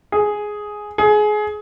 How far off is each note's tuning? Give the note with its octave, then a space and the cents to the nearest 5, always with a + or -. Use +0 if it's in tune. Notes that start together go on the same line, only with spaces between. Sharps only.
G#4 +5
G#4 +25